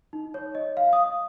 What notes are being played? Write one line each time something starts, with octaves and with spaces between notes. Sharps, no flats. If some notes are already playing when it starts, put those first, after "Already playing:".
D#4
C#5
D#5
F5
D#6